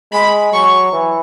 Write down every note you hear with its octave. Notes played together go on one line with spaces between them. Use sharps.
G#3 B5
F#3 C#6
E3